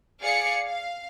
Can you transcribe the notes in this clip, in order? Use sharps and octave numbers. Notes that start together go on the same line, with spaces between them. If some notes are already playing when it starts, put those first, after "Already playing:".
G#4 D5 F5 C#7
F5